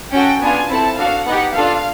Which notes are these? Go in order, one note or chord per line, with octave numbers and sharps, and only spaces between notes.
C#4 F#4 A4 G5
B3 D4 F4 G#5
C4 E4 A4 A5
D4 F#4 A4 F5
B3 D#4 G4 F#5
D4 F4 A4 F5